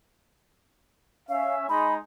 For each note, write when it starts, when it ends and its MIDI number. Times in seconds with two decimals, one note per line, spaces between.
1.28 1.67 61
1.28 1.67 76
1.28 1.54 77
1.69 1.97 56
1.69 1.97 63
1.69 1.94 83